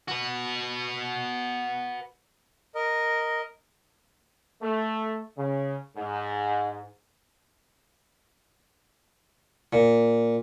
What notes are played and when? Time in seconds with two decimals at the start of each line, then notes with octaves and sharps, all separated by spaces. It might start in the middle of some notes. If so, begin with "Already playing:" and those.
0.08 F#4 B4
2.75 A#4 D#5
4.62 A3
5.37 C#3
5.97 G#2
9.73 A#2